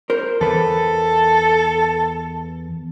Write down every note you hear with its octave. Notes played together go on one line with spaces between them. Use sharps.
A#4 C5
E2 A4 B4